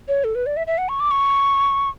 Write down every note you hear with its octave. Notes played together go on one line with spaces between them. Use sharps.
C#5
A4
B4
D5
E5
E5
F#5
C#6
D6
C#6